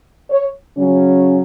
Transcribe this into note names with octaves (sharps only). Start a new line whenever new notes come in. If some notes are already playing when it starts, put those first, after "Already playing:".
C#5
C#3 F#3 C#4